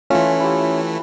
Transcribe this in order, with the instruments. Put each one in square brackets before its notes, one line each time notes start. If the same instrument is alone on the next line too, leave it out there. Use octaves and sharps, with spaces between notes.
[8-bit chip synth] E3 A3 [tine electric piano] C#4 [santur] F4
[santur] E4 G4